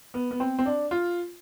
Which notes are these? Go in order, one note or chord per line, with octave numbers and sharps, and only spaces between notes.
B3
B3
C4
C4
D4
F4